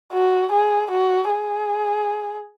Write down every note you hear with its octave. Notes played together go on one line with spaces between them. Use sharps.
F#4
G#4
F#4
G#4